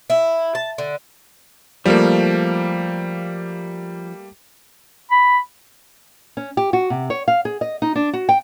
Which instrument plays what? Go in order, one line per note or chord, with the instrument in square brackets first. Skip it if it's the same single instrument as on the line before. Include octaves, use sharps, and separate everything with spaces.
[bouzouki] E4
A5
D3
[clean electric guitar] F3 [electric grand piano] G3 A3 A#3
[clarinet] B5
[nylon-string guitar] C#4
G4
F#4
C3
C#5
F5
G#4
D#5
D#4
D4
F#4
G5